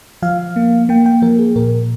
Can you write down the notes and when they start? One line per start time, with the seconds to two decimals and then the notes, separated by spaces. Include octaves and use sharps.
0.22 F3 F5
0.56 A#3
0.89 A#3 G5
1.06 G5
1.22 F3 A#4
1.39 G#4
1.56 A#2 A#4